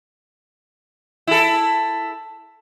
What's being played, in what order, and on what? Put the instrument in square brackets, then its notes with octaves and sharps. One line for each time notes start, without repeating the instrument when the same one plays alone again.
[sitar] E4 A4